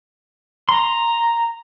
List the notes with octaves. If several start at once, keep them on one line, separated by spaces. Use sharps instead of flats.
A#5 C6